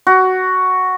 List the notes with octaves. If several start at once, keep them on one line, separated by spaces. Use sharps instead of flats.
F#4